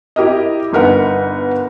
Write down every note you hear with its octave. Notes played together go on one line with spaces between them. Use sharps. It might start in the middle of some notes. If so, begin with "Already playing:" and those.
E4 G4 A#4 D#5
G1 D#4 A#4 B4 F#5